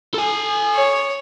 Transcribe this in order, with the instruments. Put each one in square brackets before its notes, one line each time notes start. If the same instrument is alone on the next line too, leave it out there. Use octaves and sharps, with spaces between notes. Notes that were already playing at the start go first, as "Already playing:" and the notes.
[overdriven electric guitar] A4 G#5
[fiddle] C#5